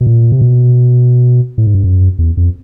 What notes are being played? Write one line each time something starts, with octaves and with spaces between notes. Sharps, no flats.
B2
A#2
C3
B2
A2
G#2
G2
F#2
E2
F2